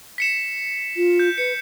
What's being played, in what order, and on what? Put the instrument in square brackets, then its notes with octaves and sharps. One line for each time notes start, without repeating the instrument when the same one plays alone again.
[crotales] B6 C#7 E7
[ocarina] F4
[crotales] G6
[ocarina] B4 [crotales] C#7